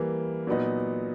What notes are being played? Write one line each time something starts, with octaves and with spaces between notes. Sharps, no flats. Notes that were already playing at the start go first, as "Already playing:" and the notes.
Already playing: E3 G3 A#3
A#2 F#3 B3 D#4